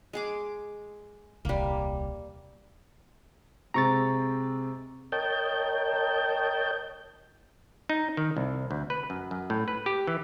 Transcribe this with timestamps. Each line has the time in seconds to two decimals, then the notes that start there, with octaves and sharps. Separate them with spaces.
0.13 G#3 G#4 D6
1.45 D#1 C2 G3 A#3
3.74 C3 G#3 C4 A#5 C#6 A6
5.12 A#4 C#5 D#5 G5 A5 G6
7.89 D#4
8.17 D#3
8.37 C2
8.71 D2
8.90 B4
9.10 F#2
9.31 F#2
9.50 A2
9.68 B4
9.86 G4
10.07 E3